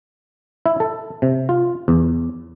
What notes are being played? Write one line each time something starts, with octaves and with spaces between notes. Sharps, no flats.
E4
A4
C3
F4
E2